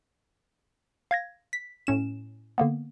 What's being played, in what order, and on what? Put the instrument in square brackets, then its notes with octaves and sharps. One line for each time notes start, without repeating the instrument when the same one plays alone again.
[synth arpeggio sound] F5 G#6 A#6
[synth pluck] B6
A2 C#4 E7
[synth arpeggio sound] D3 A#3 B3